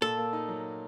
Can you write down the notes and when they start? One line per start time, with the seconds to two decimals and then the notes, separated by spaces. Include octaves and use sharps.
0.01 A#2 A4
0.17 A#3
0.33 D#4
0.48 F#3